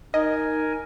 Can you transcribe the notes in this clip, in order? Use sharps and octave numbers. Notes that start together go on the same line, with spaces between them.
D#4 A#4 D#5 G#5